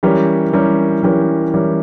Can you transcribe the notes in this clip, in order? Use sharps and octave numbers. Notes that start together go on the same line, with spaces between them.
E3 G3 C#4 G4 A#4
E3 G3 C#4 G4 A#4
E3 G3 C#4 G4 A#4
E3 G3 C#4 G4 A#4